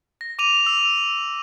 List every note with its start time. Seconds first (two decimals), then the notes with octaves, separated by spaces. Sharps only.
0.21 A#6
0.39 D6 D#7 F7
0.66 E6 F7